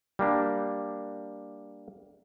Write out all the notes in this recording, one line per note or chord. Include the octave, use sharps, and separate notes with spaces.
G3 A#3 D4